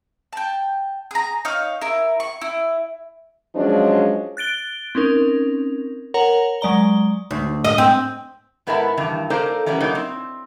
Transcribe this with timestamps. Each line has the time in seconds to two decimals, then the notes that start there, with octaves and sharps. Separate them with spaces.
0.33 G5 A5
1.11 G#4 A#5
1.45 D#4 C#5 F5
1.81 E4 A#4
2.20 C#6
2.41 E4
3.55 F3 F#3 G#3 C#4 D4
4.37 F#6 A6 D7 G7
4.95 C4 C#4 D#4 A#4
6.14 A#4 C#5 F#5 A#5
6.61 F#3 G#3 D5 A#5 G7
7.31 D2
7.65 D#5
7.78 C4
8.67 G#2 B3 E4 A#4 E5 A5
8.97 G2 D#3 E3 A5 A#5
9.30 A#3 D#4 A4 A#4 C5 D5
9.66 E3 G3 B3 C#4 A#4
9.80 F#3 A#3 D#4 A#4 C#5
9.95 C4